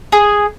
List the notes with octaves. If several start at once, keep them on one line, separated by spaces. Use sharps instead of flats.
G#4